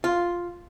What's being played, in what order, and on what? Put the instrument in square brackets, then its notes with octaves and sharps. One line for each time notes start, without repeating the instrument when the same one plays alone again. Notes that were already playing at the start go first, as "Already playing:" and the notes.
[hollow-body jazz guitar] F4